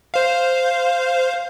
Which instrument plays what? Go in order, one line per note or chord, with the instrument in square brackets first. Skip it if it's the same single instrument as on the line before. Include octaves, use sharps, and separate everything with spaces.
[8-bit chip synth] C5 F5